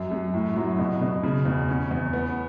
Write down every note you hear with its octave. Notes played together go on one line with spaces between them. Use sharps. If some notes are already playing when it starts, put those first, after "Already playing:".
Already playing: F#2
F#2
A2
F#3
B2
B2
C#3
E2
C#4
E2
B3